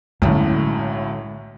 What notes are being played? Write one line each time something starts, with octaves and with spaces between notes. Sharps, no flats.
B1 F#2 A2 D3 G#3